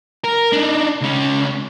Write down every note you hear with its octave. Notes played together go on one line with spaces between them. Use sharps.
A#4
D4 D#4
C#2 C#4